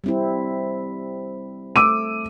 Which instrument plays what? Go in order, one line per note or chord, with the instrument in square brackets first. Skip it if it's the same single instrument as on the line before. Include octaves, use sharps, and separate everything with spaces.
[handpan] G3 C4 E4
[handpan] A3 [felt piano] D6 E6 D#7